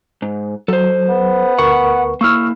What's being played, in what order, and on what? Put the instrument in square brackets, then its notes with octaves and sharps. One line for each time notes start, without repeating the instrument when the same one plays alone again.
[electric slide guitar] G#2
[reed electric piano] F#3 [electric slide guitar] A4 C5
[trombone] B3
[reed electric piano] D2 A#4 C#6 [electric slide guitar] F#5
[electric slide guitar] A#3 E4 [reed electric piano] C#6 E6 F6